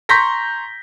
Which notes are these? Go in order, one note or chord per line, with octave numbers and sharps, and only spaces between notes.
A#5 C6 C#6 G6 A#6 B6